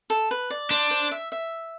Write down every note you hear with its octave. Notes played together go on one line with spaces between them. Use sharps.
A4
B4
D5
D4 C5
C5
E5
E5